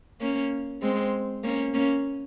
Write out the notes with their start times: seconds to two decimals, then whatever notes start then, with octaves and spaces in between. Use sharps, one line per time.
0.21 A#3 C#4
0.81 G#3 C4
1.43 A#3 C#4
1.74 A#3 C#4